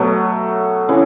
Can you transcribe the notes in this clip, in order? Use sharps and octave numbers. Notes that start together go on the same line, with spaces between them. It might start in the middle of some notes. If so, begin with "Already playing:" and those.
Already playing: B2 F#3 A3
C#3 E3